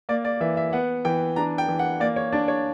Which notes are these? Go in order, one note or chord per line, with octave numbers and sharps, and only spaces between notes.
A#3 D5
D5
E3 E5
E5
B3 F#5
E3 G5
D4 A#5
G5
E3
F#5
A#3 D5
C#5
D4 D5
C#5